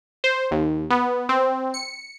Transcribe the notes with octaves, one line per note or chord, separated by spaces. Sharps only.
C5
D#2
B3
C4
C#7